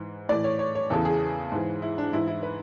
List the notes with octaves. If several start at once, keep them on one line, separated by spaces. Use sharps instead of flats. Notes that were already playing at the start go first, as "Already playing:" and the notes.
Already playing: G#2 E3
A2 E3 D5
C#5
C#5
C#5
E2 C#3 E3 A4
G#4
G#2 E3
E4
D4
G#2 E3 E4
E4
B4